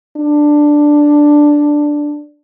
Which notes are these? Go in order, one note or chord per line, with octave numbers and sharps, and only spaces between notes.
D4